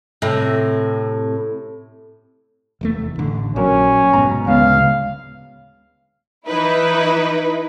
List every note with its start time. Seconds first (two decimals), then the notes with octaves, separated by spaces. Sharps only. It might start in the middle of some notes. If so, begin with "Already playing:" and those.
0.22 A2 C3
2.81 F1 E2 A3
3.19 A1 D3
3.56 A#1 A#2 F#3 C#4 A#4
4.13 F1 G#2 B2 A#5
4.47 D1 D2 C#3 G#3 B3 F5
6.47 E3 D#4 E4 B4